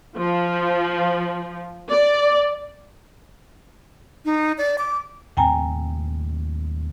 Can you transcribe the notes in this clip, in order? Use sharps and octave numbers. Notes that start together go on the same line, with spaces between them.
F3
D5
D#4
D5
D6
D#2 A2 C4 G5 G#5 A#5